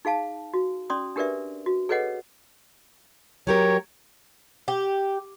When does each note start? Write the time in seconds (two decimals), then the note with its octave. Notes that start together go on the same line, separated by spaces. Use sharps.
0.05 D#4 G#4 F5 A5
0.54 F#4
0.90 C#4 D5 C6 D#6
1.16 D4 G4 A#4 B4 D5 E5
1.66 F#4
1.89 G#4 A4 B4 C#5 D#5 F#5
3.47 F#3 G4 A#4 C#5
4.68 G4